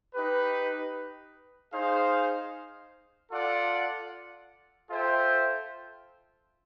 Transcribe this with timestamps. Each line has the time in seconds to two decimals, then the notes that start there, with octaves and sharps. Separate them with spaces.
0.15 D#4 G4 B4
1.73 D#4 G#4 C5 F5
3.31 F4 A4 D5 F#5
4.90 F4 A4 C5 E5 G5